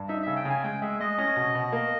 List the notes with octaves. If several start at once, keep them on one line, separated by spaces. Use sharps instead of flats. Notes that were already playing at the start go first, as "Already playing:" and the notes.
Already playing: G2
D#4 E5
C#3 E5
G5
C#3 G#5
G#3 G5
G#3 E5
G#3 D#5
C#4
B2
B2
A#3